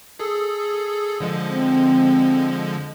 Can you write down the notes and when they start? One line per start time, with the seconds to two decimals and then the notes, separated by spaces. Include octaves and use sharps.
0.19 G#4 A4
1.20 D3 F3 G#3
1.53 C4